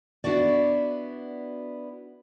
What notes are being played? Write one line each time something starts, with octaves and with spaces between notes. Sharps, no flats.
B3 D4 E4 F#4 D5